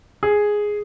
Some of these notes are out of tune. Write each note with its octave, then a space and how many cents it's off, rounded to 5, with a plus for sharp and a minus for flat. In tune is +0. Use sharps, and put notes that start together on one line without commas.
G#4 +0